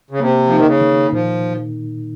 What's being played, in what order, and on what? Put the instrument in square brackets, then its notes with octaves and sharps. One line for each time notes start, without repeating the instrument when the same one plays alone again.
[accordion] C#3
[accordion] C3 [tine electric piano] A#3
[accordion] F3 [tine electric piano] D#4
[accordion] D#3
C#3
[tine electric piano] D#3
[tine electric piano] A#2 [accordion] F3